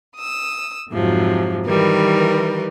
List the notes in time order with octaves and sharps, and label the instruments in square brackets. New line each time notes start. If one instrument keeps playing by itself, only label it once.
[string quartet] D#6 E6
F2 G#2 C3 F3 F#3
D#3 E3 G3 A#4 B4